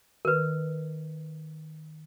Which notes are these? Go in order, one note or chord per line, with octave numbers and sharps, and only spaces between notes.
D#3 A#4 B4